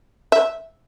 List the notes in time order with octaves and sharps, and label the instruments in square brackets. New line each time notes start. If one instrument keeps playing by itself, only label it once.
[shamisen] E5